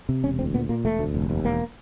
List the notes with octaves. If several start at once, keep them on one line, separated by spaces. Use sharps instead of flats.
C3
E1 C#4
D2 C4
A#2 B3
A#2 A#3
E1 A3
D2
F1
D#2
E1 A#3